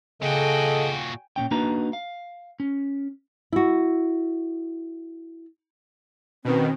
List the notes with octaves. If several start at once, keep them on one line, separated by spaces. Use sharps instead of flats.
A#2 C#3 F#4 A4 D#5 G5 G#5
A#2 C#3 C#4 G5
A#3 D4 D#4 F#4 B4 A#5
F5
C#4
E4 F#4
B2 D#3 C4 C#4 B4